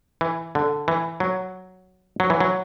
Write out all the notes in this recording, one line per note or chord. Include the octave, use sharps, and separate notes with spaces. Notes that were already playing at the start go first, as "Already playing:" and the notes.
E3
D3
E3
F#3
F#3
E3
F#3